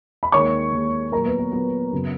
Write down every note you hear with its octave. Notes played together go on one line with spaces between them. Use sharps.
B5
D#2 D#3 G#3 C#5 C#6
D#2 D#3 G#3
A#2 F#3 A#3 A#4 A#5
B3 B4
B3 B4
A#2 F#3 A#3 B3 B4
F#2 C#3 F#3